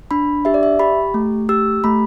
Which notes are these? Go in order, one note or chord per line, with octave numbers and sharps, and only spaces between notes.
D4 B5
G4 E5
D5
E5
G4 B5
A3
G4 E6
A3 B5